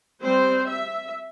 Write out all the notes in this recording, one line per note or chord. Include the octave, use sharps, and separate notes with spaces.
G3 C4 C5
E5